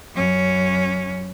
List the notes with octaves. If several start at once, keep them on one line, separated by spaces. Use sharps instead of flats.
F#2 C#4